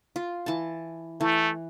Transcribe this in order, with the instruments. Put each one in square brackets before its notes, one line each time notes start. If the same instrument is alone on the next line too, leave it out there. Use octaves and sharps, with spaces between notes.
[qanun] F4
E3 A5
[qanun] E3 [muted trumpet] A3